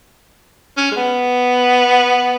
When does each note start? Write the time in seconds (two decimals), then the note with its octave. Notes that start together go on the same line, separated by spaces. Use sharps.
0.77 C#4
0.92 G#3
0.97 B3